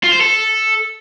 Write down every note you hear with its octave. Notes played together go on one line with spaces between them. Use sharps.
F4
C5
A4